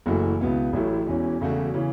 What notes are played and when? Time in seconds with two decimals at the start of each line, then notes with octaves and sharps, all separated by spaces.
0.06 F#1 F#2 E3 A3 F#4
0.40 C#2 B2 B3 E4
0.73 A1 A2 F#3 A3 E4
1.06 E1 E2 E3 C#4
1.41 E1 E2 C#3 A3 F#4
1.74 C#3 E3 C#4